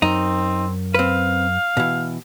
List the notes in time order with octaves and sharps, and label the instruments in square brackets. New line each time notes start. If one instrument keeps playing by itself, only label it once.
[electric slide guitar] F#2 A#4 [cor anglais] C4 [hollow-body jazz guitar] D#4
[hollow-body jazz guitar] C4 B4 [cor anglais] F5
[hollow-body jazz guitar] B2 E3